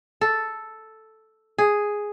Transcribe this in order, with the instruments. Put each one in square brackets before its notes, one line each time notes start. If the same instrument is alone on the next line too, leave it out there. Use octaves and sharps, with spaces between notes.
[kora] A4
G#4